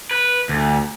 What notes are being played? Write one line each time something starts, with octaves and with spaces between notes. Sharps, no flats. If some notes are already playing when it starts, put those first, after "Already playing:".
B4
D2